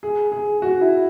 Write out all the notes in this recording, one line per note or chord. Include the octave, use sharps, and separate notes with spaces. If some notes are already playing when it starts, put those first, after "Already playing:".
G#4
G#4
F#4
E4